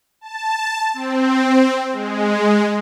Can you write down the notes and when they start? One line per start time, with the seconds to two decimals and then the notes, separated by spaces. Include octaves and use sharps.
0.21 A5
0.94 C4
1.93 G#3